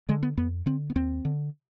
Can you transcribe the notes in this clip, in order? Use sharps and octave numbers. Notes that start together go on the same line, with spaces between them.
D3 G#3
B3
F2 B3
D3 C4
B3
D#2 C4
D3